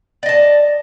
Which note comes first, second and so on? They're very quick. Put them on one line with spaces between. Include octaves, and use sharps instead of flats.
D5 D#5 A5